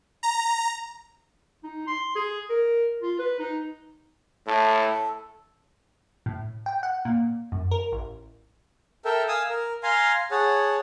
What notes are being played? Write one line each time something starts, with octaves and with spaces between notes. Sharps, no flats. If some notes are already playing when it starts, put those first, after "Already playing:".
A#5
D#4
C6
G#4
A#4
F4
B4
D#4
A2 A4
A2
G5
F#5
A#2
F#2
A#4
A1
A4 A#4 E5 G5
F5 G#5 D#6 E6
A#4
F5 G#5 A#5 C6
G#4 C#5 F#5 A5